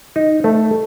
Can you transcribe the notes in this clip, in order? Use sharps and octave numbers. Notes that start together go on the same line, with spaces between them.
D#4
A3